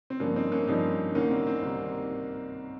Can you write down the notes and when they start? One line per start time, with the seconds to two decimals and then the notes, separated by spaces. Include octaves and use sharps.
0.10 C4
0.20 G2 F3 A#3 C#4
0.36 C4 D#4
0.52 A#3 C#4
0.67 G2 F3 C4 D#4
1.15 C2 C3 D#3 A#3 C#4
1.30 C4
1.47 C4
1.62 C2 C3 D#3